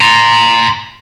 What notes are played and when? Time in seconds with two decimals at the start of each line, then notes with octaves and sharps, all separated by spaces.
0.01 A#5 C6